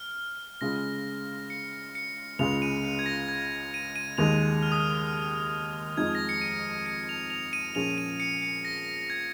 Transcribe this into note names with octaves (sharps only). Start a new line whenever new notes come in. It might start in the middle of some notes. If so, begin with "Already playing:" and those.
Already playing: F6
C#3 G#3 F4 A#6
C#7
C#7
C#2 C#3 G#3 F4 F7
D#7
C#7
G#6
A#6
G#6
D#7
D#7
D#2 D#3 G#3 F7
F6
D#6
F6
F6
F2 F3 G#3 D#4 G#6
A#6
C#7
D#7
C#7
F7
F7
D#7
A#2 F3 C#4 G#4 F7
D#7
C#7
C#7
A#6
G#6